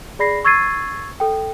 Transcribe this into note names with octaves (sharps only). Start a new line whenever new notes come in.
G#4 D5 B5 A#6 C7
C#6 E6 G#6 A6 C7 D#7
A4 G5